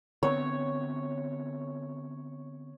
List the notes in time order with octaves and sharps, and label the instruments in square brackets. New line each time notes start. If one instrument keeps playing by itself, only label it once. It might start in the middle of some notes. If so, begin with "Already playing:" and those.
[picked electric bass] D3 B3 C4 [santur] C#5